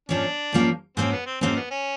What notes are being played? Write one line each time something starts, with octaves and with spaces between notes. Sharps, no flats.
G#2 F3 A#3 C#4 D4
G#2 F3 A#3 C#4
G#2 F3 A#3 C4 C#4
B3
C4
G#2 F3 A#3 C4 C#4
B3
C#4